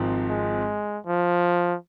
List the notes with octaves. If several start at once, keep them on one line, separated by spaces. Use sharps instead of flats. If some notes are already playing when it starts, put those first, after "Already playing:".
Already playing: G#1 G#2 F3 C4
G#3
F3